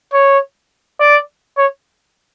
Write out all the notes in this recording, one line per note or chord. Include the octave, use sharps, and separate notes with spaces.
C#5
D5
C#5